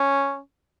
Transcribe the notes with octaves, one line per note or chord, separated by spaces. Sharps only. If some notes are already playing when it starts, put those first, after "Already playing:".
Already playing: C#4